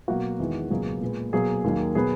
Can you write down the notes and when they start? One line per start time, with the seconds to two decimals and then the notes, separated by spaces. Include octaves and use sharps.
0.08 B2 F#3 A#3 F#4
0.40 E2 D#3 G#3
0.71 C#2 B2 F#3 A#3 G#4
1.01 A#2 G#3 B3
1.33 B2 F#3 A#3 G#4
1.64 D#2 D#3 F#3 A#3
1.95 B2 F#3 B3 G#4